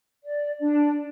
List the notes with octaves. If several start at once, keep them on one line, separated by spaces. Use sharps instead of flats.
D5
D4